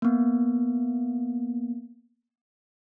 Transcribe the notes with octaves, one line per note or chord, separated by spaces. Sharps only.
A#3 B3